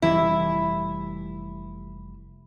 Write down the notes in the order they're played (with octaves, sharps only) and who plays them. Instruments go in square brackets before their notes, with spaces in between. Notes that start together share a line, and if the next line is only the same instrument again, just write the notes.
[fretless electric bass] F1 E3 G3 [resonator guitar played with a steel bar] E4